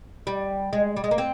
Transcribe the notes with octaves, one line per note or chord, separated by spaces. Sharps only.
G3
G#3
G3
G#3
A#3
C4